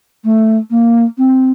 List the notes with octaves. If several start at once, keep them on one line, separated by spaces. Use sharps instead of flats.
A3
A#3
C4